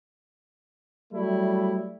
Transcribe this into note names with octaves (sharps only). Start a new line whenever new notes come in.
F#3 G3 A3 E4